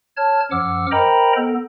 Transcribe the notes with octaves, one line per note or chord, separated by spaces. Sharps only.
C#5 A5 F6 G#6
F#2 F3 F#5 D6 E6 F6
A#4 C5 D#5 G5 A#5 B5
B3 A4